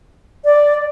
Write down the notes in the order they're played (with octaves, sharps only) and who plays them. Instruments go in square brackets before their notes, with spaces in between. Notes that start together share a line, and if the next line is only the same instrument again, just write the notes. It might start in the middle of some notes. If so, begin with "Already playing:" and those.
[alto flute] D5